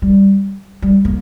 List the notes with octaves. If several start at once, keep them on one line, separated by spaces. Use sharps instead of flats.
G3
G3
A#3